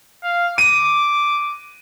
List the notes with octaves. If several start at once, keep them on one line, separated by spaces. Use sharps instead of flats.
F5
D6 D#7